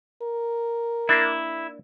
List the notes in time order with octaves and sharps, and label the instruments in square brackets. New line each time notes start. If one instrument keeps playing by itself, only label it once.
[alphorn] A#4
[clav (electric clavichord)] A#3 D4 [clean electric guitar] E4